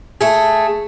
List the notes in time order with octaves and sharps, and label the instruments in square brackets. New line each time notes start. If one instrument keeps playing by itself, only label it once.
[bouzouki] A3 G#4